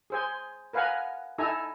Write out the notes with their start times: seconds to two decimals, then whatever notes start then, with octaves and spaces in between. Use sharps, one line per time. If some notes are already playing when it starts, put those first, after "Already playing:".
0.10 G#4 C5 G#5
0.73 A#4 B4 F5 F#5 G#5 A#5
1.38 D#4 E4 A4 G#5 A#5